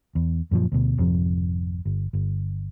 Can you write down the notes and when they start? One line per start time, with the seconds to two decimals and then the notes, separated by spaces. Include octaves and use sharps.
0.15 E2
0.51 F#2 A#2 D#3 F3
0.72 D2 B2
0.97 G#1 F2 C3 F3
1.85 G1
2.13 G1